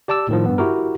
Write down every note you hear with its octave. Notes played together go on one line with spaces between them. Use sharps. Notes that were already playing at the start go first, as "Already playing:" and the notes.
G4 D5 A5 D6 E6
A2 D#3 F3
G2 B3
E4 F#4 G4 A#4